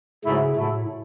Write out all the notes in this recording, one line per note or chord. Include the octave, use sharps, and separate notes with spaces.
G#2 C#3 F#3 A3 E4
A2 F#3 A3 E4 A4